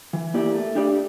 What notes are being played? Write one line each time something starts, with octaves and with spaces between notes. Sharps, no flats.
E3
A#3 E4 G4 D5
A3
D4 G4 D5